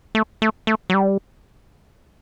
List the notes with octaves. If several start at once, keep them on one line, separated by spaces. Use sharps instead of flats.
A3
A3
A3
F#3
G3